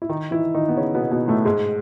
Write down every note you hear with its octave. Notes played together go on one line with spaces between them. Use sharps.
E4
D#3 D#4
E3 E4
D#3 D#4
B3
C#3 C#4
B2 B3
B2 B3
A2 A3
G#2 G#3